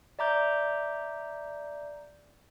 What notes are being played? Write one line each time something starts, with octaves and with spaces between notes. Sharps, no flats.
D5 E5 A#5 D6 G6